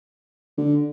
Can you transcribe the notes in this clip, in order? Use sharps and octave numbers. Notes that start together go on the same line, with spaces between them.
D3